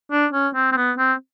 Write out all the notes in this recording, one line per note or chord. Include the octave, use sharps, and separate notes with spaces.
D4
C#4
C4
C4
B3
C4